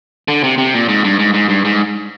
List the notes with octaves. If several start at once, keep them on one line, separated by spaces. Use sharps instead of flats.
D3
C3
C3
A#2
G#2
G2
G#2
G#2
G2
G#2